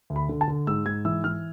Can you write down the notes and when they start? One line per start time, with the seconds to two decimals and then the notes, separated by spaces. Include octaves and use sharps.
0.10 D2
0.16 B5
0.29 D3
0.41 A5
0.48 D3
0.67 G#2 E6
0.85 G#2 G#6
1.05 E3 E6
1.24 E3 F6